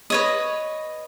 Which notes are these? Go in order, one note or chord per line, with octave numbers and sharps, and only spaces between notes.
B4 C#5 D#5